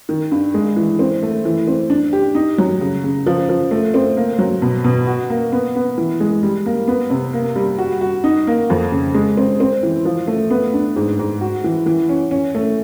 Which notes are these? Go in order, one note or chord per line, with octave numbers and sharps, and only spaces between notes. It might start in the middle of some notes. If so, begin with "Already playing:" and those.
D#3
G2
G#3
E3
C4
A3
E3
C4
D4
G4
D#4
F#3
C#3
C#3
F3
F3
A3
C4
A#3
F#3
B2
B2
F#4
A#3
B3
B3
E3
G#3
G3
A#3
B3
C3
A#3
G3
F#4
F#4
D#4
A#3
F2
C#3
G#3
C4
C4
E3
F3
A3
B3
D4
G#2
G#2
F#4
E3
E3
C#4
C#4
A3